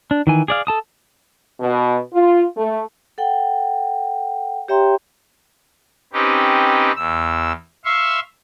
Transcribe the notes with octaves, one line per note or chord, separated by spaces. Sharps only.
D4
D#3 E3 G#5
G#4 D5 F5
A4 A5 D#6
B2
F4
A3
A4 F#5 G5
G4 C#5 E5 G5 A#5 C6
C4 C#4 D#4 G4 B4
E2 E6
E5 F5 C6 C#6 E6